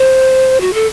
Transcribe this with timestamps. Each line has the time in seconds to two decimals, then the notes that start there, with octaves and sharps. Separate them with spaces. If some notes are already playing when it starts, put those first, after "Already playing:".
Already playing: C5
0.61 F#4
0.74 A4